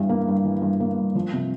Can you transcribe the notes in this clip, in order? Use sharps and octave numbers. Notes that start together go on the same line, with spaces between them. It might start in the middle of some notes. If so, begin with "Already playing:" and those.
Already playing: G2 E3
A#3
G2
E3
G2
A#3
G2
F3
C3